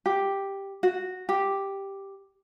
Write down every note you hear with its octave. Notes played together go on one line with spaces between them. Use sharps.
G4
F#4
G4